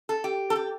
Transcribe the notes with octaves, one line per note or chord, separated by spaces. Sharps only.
A4
G4
A4
G4